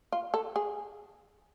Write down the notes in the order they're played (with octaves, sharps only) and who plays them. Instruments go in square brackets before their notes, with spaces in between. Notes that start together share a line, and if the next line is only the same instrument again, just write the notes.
[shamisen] F4
A4
G#4